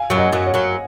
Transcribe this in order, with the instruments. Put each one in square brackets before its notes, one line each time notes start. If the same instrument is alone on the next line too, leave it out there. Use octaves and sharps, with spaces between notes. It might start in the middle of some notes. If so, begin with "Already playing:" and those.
Already playing: [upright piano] F5 G#5
[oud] F#2 F#3
[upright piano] D#5 F#5
[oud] F#2 F#3
[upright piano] C#5
[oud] F#2 F#3